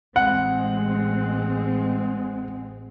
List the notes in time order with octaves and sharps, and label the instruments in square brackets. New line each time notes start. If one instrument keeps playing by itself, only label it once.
[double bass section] A1 G#3 C4 [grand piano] F#5